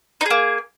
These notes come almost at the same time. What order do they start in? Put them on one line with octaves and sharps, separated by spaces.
D#4 G#4 A#3